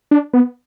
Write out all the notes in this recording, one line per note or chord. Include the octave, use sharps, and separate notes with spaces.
D4
B3